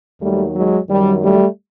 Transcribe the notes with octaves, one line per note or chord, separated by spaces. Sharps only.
D#2 D#3 F#3 G3 A3
F#3 G#3
F#2 D#3 F#3 G3
G3 A3